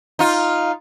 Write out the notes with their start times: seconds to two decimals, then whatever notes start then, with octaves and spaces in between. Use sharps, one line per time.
0.19 D#4 F4